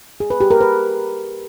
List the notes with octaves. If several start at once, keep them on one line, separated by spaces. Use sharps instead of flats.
G#4
B4
G4
A#4
B4